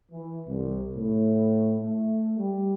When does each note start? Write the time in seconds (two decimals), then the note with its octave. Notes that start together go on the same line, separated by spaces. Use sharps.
0.12 E3
0.47 C2
0.96 A2
1.80 A3
2.38 G3